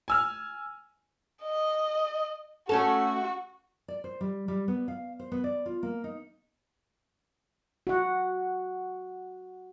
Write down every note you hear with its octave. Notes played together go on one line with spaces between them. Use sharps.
G#5 E6 F6
D#5
A3 C#4 F#4 A4
D5
C5
G3
G3
B3
F5
C5
B3
D5
F4
A#3
D#4
F#4 F#5